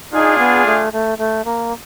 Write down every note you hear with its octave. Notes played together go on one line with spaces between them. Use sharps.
D4 D#4 F4 G#4
B3
A3
A3
A3
A#3